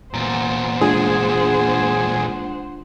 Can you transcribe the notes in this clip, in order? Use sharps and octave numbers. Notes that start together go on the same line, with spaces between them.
E2 A#2 C5 F#5 A#5 A6
G#3 D4 F4 G#4